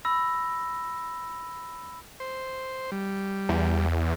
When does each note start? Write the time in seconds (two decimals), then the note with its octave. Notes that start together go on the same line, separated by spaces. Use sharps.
0.05 B5 E6 A#6
2.20 C5
2.92 G3
3.49 E2